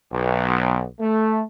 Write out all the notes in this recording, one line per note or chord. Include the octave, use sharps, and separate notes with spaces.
B1
A3